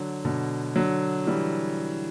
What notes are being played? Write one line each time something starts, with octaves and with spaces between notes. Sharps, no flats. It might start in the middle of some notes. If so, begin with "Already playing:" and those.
Already playing: D3 F#3
B2 D3
D3 F#3
E3 G3